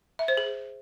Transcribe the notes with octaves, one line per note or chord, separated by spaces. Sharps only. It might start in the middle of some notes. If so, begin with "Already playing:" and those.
E5
C5
G#4